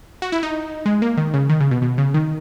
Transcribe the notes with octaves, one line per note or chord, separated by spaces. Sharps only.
F#4
E4
D#4
G#3
A#3
D#3
C#3
D#3
C#3
B2
B2
C#3
D#3